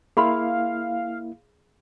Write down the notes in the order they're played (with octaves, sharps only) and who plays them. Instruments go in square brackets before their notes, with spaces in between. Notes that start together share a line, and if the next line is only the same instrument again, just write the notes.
[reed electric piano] A#3 E4 [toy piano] G#4 B5 C6 [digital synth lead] F5